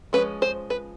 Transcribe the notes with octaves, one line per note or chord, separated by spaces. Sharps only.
F3 G#3 C#4 B4
C5
B4